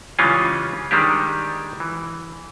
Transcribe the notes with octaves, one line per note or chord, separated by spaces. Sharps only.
C#3 E3 G3 G#3 C#4 F4
D#3 G3 G#3 D4 G4
E3